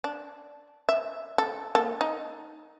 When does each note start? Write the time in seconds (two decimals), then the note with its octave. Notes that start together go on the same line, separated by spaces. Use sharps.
0.04 D4
0.89 E5
1.38 A4
1.75 A#3 A4
2.01 D#4